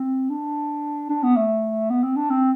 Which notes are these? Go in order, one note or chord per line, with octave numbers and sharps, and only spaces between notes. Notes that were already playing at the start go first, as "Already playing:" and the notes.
Already playing: C4
D4
D4
B3
A3
B3
C4
D4
C4